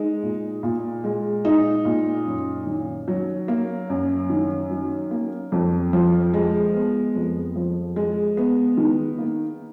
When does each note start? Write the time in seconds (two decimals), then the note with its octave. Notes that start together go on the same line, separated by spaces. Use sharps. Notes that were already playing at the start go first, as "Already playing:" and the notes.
Already playing: G#3 D#4
0.23 A#2
0.63 A#2
1.04 G#3
1.45 D#4
1.85 A#2
2.26 F#2
2.67 D#3
3.08 F#3
3.48 A#3
3.90 F#2
4.30 D#3
4.71 F#3
5.11 A#3
5.52 F2
5.93 F3
6.34 G#3
6.74 B3
7.16 F2
7.56 F3
7.96 G#3
8.37 B3
8.77 D#3
9.18 A#3